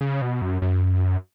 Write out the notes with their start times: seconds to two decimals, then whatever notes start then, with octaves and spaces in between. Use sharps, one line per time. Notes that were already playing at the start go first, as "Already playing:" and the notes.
0.01 C#3
0.22 B2
0.42 F#2
0.62 F#2